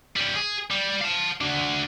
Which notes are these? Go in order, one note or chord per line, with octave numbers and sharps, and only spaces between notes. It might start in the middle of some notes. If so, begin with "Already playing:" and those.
G3 C#4
G#4
G3
F5 A5
D4 F#4